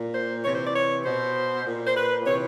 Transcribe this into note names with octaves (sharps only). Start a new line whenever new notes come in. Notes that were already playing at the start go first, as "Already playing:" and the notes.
Already playing: A#2
C5
C3 E3 C#5
C5
D5
C#5
B2 C5
A#2
C5
B4
C3 E3 C#5